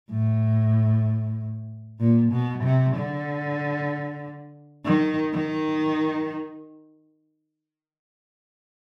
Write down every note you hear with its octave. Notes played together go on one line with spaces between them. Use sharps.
A2
A#2
B2
C3
D3
D#3
D#3